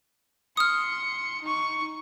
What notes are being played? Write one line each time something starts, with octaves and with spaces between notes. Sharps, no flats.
C6 D#6 F6 C#7
D#4 C#6